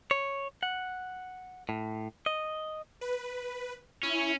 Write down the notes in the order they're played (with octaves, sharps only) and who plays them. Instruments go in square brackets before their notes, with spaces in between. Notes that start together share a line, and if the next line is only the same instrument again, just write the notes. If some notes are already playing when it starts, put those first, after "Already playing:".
[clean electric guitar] C#5
F#5
A2
D#5
[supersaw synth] B4
[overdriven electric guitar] C#4 [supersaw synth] E4